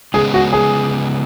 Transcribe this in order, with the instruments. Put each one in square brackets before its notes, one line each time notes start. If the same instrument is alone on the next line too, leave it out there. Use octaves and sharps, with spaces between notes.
[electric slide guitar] C#3 G#3 B3 [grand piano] G#4
[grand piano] F#4
G#4